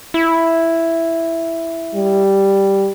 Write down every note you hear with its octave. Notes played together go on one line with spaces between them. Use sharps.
E4
G3